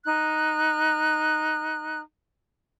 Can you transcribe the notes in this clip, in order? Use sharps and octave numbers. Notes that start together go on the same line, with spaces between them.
D#4 F#6